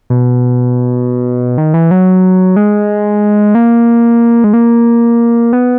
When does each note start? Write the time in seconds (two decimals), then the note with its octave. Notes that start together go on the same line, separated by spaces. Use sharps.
0.10 B2
1.58 D#3
1.74 E3
1.91 F#3
2.57 G#3
3.55 A#3
4.44 G#3
4.54 A#3
5.53 B3